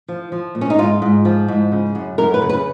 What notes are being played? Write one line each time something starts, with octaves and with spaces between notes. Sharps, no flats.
F3
F3
A#2
C#4
D#4
G#2 F4
G#2
F3
G#2
C#3
F#2
F#2 A#4
B4
C#3
B4